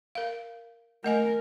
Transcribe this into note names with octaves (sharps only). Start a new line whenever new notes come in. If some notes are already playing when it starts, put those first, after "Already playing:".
A#4 F5
A3 A#4 D#5 G#5